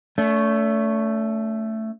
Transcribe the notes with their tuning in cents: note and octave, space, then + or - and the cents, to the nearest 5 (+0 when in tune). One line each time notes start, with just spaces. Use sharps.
A3 +10 D4 -45